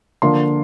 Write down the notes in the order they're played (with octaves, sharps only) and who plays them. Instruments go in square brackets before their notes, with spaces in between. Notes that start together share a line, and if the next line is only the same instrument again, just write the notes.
[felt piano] D3 F3 A#3 C6